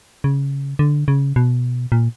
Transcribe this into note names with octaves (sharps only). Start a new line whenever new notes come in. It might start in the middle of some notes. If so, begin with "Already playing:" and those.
C#3
D3
C#3
B2
A#2